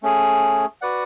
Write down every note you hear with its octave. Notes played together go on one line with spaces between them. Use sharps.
A3 C#4 G#4
F#4 B4 D5 F#5